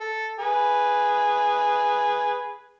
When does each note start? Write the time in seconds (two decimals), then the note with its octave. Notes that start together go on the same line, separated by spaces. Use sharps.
0.01 A4
0.39 G#4 B4